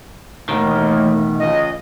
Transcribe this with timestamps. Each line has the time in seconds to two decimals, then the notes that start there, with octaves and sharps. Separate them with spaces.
0.49 D#2 B2 D#3 E3 A3
1.39 C#2 D#5